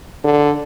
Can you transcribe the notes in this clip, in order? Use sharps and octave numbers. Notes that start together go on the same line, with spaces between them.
D3